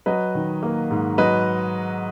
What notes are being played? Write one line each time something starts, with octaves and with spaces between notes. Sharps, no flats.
F#3 B4 D#5
D#3
A#3
G#2
F#3 B4 D#5